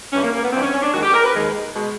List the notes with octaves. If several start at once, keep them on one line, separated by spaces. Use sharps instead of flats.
G2 E3 G3 C#4
A#3
A#3
B3
G2 E3 G3 C4
C#4
C#4
D4
D#2 D#3 G#3 F#4
G4
A#4
B4
D#2 D#3 G#3
B2 G#3